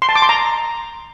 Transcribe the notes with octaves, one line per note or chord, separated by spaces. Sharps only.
C6
A5
D6
C6
A#5